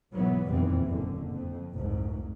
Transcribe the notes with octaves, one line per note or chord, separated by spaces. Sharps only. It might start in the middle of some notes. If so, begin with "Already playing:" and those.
B1 G#2 E3 F#3 B3
F1 E2 A#2 E3 G3 C4
F#1 F#2 D3
F2
F1 C2 G#2